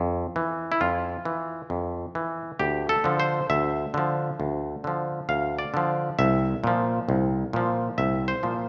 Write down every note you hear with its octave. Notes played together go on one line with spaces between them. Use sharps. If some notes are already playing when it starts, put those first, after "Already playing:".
Already playing: F2
E3
E4
F2 F4
E3
F2
E3
D2 G4
A4
D3 F3
C5
D2 E5
D3 F3
D2
D3 F3
D2 F5
D5
D3 F3
C2 E5
A#2 F3
C2
A#2 F3
C2 E5
C5
A#2 F3